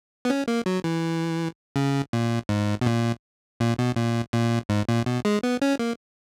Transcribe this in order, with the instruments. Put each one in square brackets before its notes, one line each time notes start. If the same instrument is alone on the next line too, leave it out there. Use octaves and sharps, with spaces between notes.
[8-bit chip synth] B3
C#4
A#3
F#3
E3
C#3
A#2
G#2
B2
A#2
A#2
B2
A#2
A#2
G#2
A#2
B2
G#3
B3
C#4
A#3